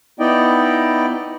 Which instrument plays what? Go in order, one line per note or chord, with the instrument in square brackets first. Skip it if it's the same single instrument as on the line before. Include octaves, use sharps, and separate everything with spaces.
[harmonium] B3 D#4 E4 D5 D#5 G5